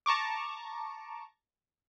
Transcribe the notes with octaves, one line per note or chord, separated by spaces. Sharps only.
A5 A#5 C#6 D6